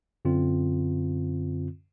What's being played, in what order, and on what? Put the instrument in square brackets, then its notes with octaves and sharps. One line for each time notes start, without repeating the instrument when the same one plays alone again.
[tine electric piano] F#2 D3 C4 F4